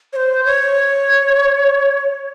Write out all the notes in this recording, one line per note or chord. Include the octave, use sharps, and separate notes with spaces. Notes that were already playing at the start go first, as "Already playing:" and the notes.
C#5
C5
C#5